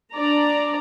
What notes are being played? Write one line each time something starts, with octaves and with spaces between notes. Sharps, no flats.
D4 D5 A#5